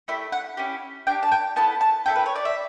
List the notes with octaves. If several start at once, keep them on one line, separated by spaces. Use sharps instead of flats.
A3 E4 G4 E5
F#5
C#4 E4 G4
D4 G4 G5
A5
G5
B3 E4 A4 A5
A5
A3 E4 A4 G5
B4
C#5
D5
E5